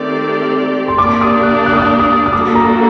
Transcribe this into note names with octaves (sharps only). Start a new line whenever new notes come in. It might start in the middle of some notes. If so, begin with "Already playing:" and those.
Already playing: D#3 A3 C4 G4 D5
C6
A#3 D4 G4 D5 D6
D#6
F#6
F#6
D#6
F#6
D#6
D#6
G3 A#3 D4 F#4 A4 D6
A#5